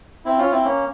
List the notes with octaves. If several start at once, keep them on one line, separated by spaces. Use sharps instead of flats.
C4 E4
C#4 F4
C4 E4
A#3 C#4